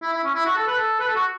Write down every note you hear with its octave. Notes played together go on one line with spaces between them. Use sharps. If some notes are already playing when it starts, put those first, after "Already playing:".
E4
E4
C#4
E4
F#4
A4
B4
A4
B4
A4
F#4